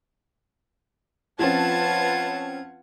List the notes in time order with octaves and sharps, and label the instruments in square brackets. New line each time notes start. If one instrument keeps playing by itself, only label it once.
[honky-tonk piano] F3 C4 C#4 [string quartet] F4 F#5 G#6 [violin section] B4 A5